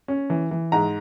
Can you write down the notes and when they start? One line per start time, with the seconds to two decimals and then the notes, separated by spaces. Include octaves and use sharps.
0.08 C#4
0.30 E3
0.51 E3
0.72 G#2 A#5